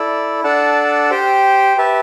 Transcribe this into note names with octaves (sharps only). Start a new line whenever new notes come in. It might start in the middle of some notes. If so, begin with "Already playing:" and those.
Already playing: E4 A4 D5
D4 A4 D5 F#5 A5
G4 C5 G5
G4 B4 E5 A5